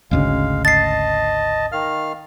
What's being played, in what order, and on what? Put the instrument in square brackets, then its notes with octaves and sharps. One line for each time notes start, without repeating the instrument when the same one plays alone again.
[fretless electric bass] G#1 D2 C#3 [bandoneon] G#3 F5
[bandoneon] D#5 A5 [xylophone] A6 C7
[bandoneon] D#3 F5 F6